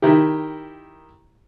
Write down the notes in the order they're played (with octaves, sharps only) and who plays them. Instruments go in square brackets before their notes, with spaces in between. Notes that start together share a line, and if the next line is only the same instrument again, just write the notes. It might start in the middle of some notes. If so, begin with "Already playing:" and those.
[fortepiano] D#3 E4 G4